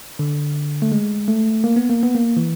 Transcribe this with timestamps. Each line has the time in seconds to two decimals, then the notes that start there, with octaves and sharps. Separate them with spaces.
0.19 D3
0.82 A3
0.92 G#3
1.28 A3
1.64 A#3
1.76 B3
1.90 A#3
2.03 B3
2.15 A#3
2.37 E3